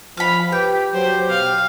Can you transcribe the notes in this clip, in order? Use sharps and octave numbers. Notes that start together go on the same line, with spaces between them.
F3 F5 B5
G4 B4 G5
F#3 C5
B2 F5